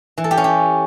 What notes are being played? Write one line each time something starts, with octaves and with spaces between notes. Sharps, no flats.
E3
A4
G4
C#4
G4